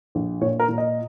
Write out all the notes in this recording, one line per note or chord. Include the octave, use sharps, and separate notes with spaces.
A#1
A#2 C#5
A#4
A#2
D#5